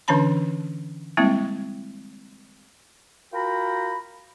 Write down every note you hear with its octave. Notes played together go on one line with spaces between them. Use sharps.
D3 E3 C#4 D4 A5 B5
G3 G#3 A#3 C4 E4
F4 F#4 A#4 G5 A#5 B5